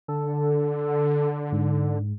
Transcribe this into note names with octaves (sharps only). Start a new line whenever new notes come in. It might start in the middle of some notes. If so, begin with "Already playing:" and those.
D3 A4
G#2